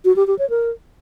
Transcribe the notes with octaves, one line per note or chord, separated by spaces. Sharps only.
F#4
G4
G4
C#5
A#4